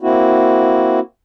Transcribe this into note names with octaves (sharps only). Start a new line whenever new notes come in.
A#3 C4 E4 F#4